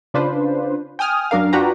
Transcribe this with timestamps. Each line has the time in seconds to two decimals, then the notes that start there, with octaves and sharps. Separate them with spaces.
0.14 C#3 D4 F4 B4 C5
0.99 G5 G#5 D#6 F6
1.31 F#2 F#3 D4 A#4 F5
1.53 D4 F4 F#4 B4 G5 A#5